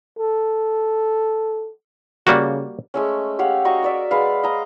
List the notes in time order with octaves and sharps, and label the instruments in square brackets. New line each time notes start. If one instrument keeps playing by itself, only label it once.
[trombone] A4
[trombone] C#3 [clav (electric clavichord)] G3 A#3 F#4
[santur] G#3 A3 C#4
G4 C#5 F5 F#5
F#4 D#5 A#5 C#6
A#4 D5 E5
G#3 B4 F5
D#5 A#5